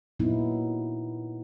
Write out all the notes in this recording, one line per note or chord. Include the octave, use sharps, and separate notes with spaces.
A#2 F#3 B3 D#4 E4